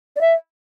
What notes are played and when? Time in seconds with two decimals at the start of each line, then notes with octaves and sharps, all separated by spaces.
0.16 D5
0.21 E5